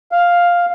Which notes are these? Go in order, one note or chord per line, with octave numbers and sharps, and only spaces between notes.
F5